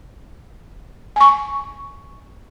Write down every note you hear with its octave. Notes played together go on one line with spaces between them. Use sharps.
G#5 C#6